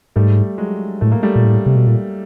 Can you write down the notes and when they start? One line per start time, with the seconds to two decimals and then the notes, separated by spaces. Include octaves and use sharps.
0.16 G#2 G3 A3
0.58 F#3 G#3
1.01 A2 A3
1.12 A#3
1.23 G3 A3
1.36 A#2
1.45 A2
1.66 C3
1.76 B2
1.87 A#2